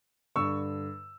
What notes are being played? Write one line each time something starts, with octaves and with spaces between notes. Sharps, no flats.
G2 D3 C#6 E6